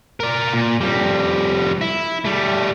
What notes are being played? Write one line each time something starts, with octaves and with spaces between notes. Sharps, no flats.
A#4 D5
A#2
F2 G3
E4
G3 A3